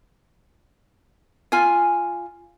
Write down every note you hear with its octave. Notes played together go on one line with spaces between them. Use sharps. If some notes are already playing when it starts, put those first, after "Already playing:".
F4 G#5